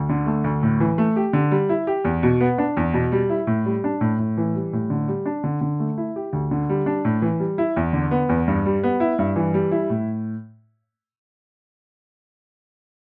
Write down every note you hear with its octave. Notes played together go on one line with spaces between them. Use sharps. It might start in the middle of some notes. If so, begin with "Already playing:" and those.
Already playing: D2
D3
A3
D2
A2
E3
A3
G4
D3
G3
E4
G4
E2
B2
B3
D4
E2
B2
G3
E4
A2
G3
D4
A2
A2
E3
G3
A2
D3
G3
D4
D3
D3
A3
E4
G4
D2
D3
G3
D4
A2
E3
G3
E4
E2
D3
B3
E2
G2
G3
B3
E4
G2
E3
G3
E4
A2